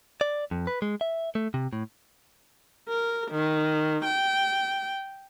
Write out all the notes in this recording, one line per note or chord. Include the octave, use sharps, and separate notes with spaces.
D5
F2
B4
G#3
E5
A3
C3
A2
A#4
D#3
G5